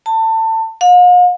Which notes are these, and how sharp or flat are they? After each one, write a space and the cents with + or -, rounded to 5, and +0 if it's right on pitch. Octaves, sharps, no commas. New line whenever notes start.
A5 +25
F5 +45